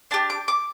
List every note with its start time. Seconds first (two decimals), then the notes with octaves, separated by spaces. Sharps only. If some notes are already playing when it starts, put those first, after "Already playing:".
0.11 D4 G4 A5
0.30 D6
0.48 D6